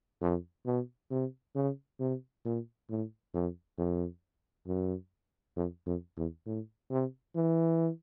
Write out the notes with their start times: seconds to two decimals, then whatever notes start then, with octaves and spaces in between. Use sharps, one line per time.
0.21 F2
0.66 B2
1.11 C3
1.55 C#3
2.00 C3
2.45 A#2
2.90 A2
3.34 F2
3.78 F2
4.67 F#2
5.57 F2
5.86 F2
6.17 E2
6.46 A2
6.91 C3
7.36 E3